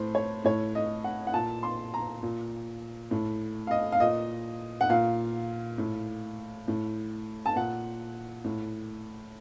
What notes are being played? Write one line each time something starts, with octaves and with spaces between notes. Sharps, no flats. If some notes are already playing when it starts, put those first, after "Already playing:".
Already playing: A2 C5
C#5
A2 C#5
D#5
F#5
F#5
A#2 A5
C6
A#5
A#2
A2
F5
D#5
F5
A#2 D#5
F#5
A#2 F5
A2
A2
A5
A#2 F#5
A2